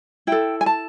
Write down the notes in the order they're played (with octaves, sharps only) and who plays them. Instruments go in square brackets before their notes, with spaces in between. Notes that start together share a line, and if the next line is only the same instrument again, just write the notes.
[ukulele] E4 A4 G5
G#5
A5